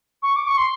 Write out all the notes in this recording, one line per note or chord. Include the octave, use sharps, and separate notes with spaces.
C#6
D6
C#6
C6